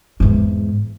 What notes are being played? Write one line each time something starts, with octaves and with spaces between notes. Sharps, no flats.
E2 G#2